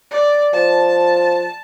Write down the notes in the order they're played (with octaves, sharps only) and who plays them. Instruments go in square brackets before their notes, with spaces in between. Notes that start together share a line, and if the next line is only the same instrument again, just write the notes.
[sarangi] D5
[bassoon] F3 [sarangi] A5